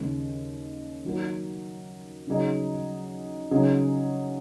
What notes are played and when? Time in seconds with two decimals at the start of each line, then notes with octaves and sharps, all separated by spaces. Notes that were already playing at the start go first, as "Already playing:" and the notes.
Already playing: D#2 C#3 G#3
1.05 D#3 F#3 A#3 F#4 A#4
2.27 C#3 F#3 D#4 G#4 D#5
3.51 C#3 F#3 D#4 G#4